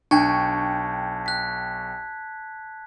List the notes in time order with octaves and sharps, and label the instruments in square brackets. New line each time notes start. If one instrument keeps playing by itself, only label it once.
[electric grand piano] B1 G5 C#6 [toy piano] D4 [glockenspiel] A5 F#6 G#6
[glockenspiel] F#6 B6